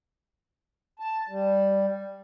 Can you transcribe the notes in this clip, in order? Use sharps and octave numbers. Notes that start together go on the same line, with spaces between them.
A5
G3